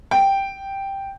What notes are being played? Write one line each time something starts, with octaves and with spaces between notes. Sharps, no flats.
G5